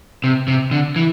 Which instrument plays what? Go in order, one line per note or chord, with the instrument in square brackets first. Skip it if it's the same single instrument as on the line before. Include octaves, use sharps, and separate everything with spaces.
[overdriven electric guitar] C3
C3
D3
E3